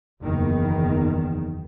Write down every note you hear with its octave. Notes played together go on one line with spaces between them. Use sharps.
F#1 E2 D#3